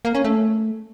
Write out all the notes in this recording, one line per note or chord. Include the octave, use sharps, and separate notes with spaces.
A#3
C#4
A3